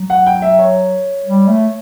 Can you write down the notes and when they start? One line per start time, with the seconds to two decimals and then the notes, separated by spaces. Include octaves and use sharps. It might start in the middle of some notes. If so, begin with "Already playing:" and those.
Already playing: F#3
0.10 F#5
0.27 G5
0.42 E5
0.59 C#5
1.26 G3
1.48 A3